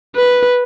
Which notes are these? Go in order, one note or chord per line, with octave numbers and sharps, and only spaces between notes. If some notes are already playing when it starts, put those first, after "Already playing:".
B4